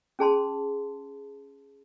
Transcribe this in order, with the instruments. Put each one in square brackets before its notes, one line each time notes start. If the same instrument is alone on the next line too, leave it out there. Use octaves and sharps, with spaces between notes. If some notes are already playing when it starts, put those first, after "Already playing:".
[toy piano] C#4 G#4 A5 C6